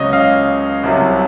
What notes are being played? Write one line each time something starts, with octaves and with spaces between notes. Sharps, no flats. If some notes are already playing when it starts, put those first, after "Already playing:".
Already playing: C#2 C#3 F#3 C#5 D#5
F5
C2 C3 F#3